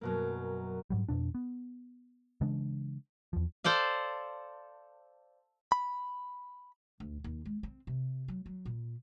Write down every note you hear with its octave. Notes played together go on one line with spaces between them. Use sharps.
F#2 B2 A#3
G#2 F#3 G3
F2 B2 D4
B3
C#3 E3 G#3 D4
E2 F3
A4 C5 D5 F5
B5
D2
D#2
G#3
C4
C3
F#3
F#3
A#2